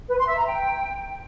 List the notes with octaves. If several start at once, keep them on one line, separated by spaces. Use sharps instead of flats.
B4
C6
E5
A#5
G5